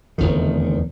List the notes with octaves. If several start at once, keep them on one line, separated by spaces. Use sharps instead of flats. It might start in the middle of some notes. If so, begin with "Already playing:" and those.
F1 E2 D3 D#3